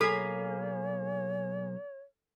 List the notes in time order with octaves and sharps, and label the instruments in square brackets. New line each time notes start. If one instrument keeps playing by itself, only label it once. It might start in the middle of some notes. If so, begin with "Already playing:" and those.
[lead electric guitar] B1 A#3 [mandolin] G#4 F5 B5 [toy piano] A4 [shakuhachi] C#5